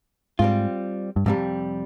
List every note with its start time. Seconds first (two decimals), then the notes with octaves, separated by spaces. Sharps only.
0.39 G#2 G3 C4 F4
1.16 G2
1.26 F2 G#2 C3 G3